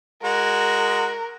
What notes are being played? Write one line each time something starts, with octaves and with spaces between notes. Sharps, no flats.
G#3 F#4 A#4